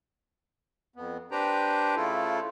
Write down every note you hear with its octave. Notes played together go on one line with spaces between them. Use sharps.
F2 B3
D4 G4 B4 C5 G5 A#5
C#3 A3 E4 F4 A4